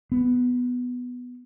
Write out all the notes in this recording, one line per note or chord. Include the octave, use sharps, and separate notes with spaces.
B3